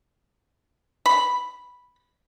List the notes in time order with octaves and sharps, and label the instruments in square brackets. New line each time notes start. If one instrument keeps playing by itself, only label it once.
[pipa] B5